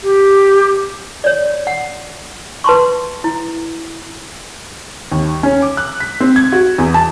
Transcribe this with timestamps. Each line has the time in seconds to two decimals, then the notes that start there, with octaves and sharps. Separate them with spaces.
0.03 G4
1.24 C#5 D5
1.67 F#5
2.64 B4 A5 C6 C#6
3.24 E4
5.12 D#2
5.43 C#4
5.62 D6
5.77 F#6
6.00 B6
6.20 C4
6.36 G#6
6.52 F#4
6.78 E2
6.94 A5